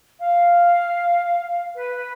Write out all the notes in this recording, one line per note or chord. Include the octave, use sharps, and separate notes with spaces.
F5
B4